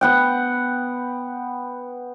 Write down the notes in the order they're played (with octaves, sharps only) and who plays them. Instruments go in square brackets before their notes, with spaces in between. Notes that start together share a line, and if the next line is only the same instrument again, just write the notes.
[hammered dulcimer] B3 F#5 G5